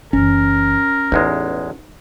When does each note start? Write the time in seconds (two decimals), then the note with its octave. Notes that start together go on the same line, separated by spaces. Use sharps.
0.13 F#1 E3 C#4 A#4
1.12 A1 E2 G#3 D#4